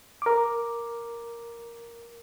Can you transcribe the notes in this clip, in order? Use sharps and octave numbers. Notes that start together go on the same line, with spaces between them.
A#4 D6